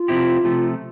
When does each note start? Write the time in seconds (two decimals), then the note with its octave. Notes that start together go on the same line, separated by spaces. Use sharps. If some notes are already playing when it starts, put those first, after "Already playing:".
Already playing: F4
0.08 C3 F3 C4 E4 G4
0.44 C3 F3 A3